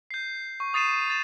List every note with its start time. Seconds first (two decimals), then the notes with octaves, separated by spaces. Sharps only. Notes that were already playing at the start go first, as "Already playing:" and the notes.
0.11 G6 C7
0.60 C#6
0.73 C#6 D#6 A6 C7 D#7 E7
1.10 A6 E7